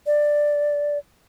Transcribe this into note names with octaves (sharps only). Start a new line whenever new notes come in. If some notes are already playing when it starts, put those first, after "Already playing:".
D5